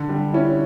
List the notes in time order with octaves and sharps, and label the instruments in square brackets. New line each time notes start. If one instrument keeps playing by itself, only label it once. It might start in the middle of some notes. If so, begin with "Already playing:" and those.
Already playing: [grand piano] D3
[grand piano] G3 [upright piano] D4
[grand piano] C#4 [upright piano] E4